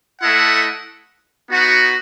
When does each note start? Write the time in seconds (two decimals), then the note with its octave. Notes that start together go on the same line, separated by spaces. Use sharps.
0.21 A3 E4 A4 D#5 F#5
1.50 B3 D#4 F#4